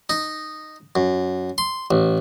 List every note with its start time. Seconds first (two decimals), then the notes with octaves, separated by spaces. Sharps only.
0.10 D#4
0.96 F#2
1.58 C6
1.91 A1